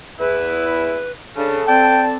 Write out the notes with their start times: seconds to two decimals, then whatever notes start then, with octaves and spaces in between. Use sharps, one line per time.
0.19 E2 E4 B4
1.36 C#3 D4 A4
1.67 C4 D5 G5 A5